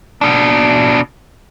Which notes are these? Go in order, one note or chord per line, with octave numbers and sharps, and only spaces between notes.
B2 D4